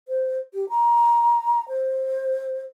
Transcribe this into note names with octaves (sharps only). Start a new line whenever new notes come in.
C5
G4
A#5
C5